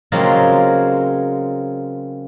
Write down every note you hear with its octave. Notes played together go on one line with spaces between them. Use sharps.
C#3 F#3 G#3 A#3 C4 F4